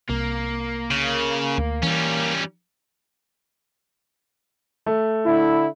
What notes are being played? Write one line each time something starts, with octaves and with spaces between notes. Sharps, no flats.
C2 A#3
C#3
D2
E3 G3 C#4
A3
D3 E4